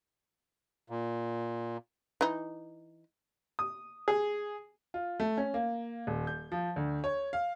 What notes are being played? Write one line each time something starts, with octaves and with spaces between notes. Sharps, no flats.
A#2
E3 D#4
D#6
G#4
F4
A3
C#4
A#3
D#1
G6
F3
D2
C#5
F5